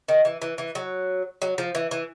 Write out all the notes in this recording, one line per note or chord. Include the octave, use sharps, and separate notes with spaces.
D#3
E3
E3
E3
F#3
F#3
F3
E3
E3